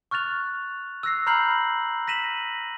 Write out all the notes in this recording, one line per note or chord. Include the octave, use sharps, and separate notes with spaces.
C#6 F6 F#6 A6 F7
E6 F#6 A#6 C7
A#5 B5 F6 G6 C7 F#7
A#6 B6 D#7 E7 F#7